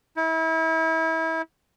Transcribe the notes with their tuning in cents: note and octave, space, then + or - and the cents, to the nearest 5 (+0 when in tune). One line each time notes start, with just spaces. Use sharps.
E4 -30